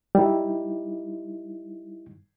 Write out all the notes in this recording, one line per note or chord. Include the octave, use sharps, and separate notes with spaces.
G3 D#4 E4